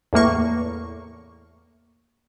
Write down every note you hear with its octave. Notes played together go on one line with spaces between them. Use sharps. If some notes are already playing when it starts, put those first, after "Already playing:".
E2 A2 A#3 C#6